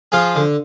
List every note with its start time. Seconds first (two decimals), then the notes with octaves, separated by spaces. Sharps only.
0.12 F3 F4 G#4
0.36 D3